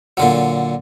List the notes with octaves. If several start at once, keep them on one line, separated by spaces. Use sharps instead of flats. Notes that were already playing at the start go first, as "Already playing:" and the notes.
A#2 D3 F#3